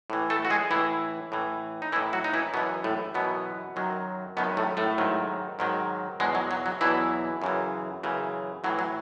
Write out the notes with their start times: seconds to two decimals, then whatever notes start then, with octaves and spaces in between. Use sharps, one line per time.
0.10 A2 E3
0.30 A3 A4
0.45 F#4
0.50 G#3 G#4
0.71 A2 E3 E4
1.32 A2 E3
1.82 D#4
1.92 E3 E4
1.96 A2
2.13 F#3 F#4
2.24 D#4
2.33 E3 E4
2.54 F#2 B2 E3 B3
2.84 A2 A3
3.14 F#2 B2 E3 B3
3.76 F#2 D#3 F#3
4.37 F#2 B2 D#3 F#3 B3
4.57 A2 A3
4.77 A2 A3
4.98 G#2 D#3 F#3
5.59 G#2 D#3 F#3
6.20 E2 B2 F#3 G#3
6.35 F#3
6.51 F#3
6.66 F#3
6.81 E2 B2 E3 F#3 E4
7.42 F#2 C#3 E3
8.03 F#2 C#3 E3
8.64 A2 E3 F#3
8.79 F#3